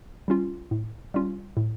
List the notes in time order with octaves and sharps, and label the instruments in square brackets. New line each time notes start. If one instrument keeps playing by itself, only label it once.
[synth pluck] G3 C#4 F4
A2
G3 C#4 F4
A2